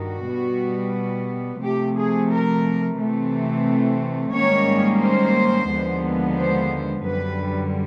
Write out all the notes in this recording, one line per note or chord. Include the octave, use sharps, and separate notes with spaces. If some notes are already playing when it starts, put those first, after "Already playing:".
Already playing: G2 D#3 G3 F#4
B2 G3 B3
C3 F3 A3 G4
G#4
A#4
C3 E3 A3 C4
G#2 D#3 G3 A#3 C#4 C#5
C5
D#2 D3 F3 G#3 B3
C5
F#2 D3 G3 B4